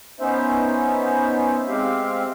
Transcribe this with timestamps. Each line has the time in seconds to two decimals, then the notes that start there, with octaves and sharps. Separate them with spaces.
0.20 B3 C#4 D#4 C5 E5
1.68 G#3 C4 G4 E5 F5